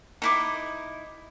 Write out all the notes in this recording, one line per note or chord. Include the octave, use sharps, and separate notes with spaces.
D#4 E4 D6